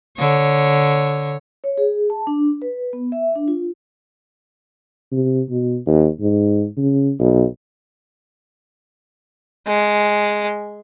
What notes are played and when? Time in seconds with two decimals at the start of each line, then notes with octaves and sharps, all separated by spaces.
0.18 D3 C#5
1.64 C#5
1.78 G#4
2.10 A5
2.27 D4
2.62 B4
2.93 B3
3.12 E5
3.35 D4
3.48 F4
5.11 C3
5.49 B2
5.86 D#2
6.21 G#2
6.77 C#3
7.19 B1
9.67 G#3